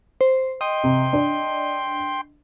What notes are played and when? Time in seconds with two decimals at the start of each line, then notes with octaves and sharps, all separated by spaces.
0.21 C5
0.61 D#5 G5 C6
0.84 C3
1.13 D4